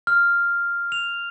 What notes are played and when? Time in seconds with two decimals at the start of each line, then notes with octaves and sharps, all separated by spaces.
0.07 F6
0.92 F7